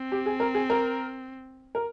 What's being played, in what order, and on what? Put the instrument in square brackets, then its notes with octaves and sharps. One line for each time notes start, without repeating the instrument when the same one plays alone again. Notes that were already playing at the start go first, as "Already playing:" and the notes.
Already playing: [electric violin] C4
[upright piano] G4
G#4
A#4
G#4
A#4
A#4